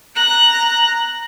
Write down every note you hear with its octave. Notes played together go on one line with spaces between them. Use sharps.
A#5 F#6